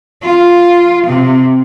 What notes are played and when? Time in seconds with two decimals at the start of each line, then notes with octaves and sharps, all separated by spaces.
0.22 F4
1.06 C3